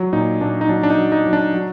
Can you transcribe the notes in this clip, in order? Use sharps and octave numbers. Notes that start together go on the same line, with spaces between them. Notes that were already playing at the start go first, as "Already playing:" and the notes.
Already playing: F#3
A#2 D#4
A#2 D4
D#4
F#3 D4
D4
D#4
F#3
D#4
F#3
D4
F#3